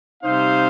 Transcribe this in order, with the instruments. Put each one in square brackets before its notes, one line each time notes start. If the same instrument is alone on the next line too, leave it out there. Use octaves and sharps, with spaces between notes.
[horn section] C3 G3 C4 D#4 C5 F5